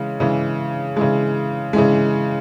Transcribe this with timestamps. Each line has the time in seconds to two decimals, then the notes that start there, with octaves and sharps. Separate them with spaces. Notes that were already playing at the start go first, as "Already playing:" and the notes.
Already playing: C#3 E3 G#3
0.20 C#3 E3 G#3
0.96 C#3 E3 G#3
1.73 C#3 E3 G#3